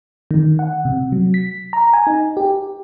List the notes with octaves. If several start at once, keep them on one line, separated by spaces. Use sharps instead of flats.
D#3
F#5
C3
F#3
B6
A#5
G#5
D#4
G4